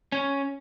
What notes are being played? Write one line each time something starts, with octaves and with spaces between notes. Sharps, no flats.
C#4